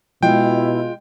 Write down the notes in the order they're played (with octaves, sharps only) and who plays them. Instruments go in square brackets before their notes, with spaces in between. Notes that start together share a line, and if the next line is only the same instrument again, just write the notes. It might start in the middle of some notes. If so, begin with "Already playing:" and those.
[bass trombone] B2 [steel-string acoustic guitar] G#3 F4 [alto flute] E4 [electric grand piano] G5